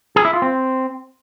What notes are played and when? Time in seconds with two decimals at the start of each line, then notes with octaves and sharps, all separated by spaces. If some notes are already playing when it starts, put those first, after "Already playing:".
0.16 G#4
0.25 E4
0.33 F4
0.42 C4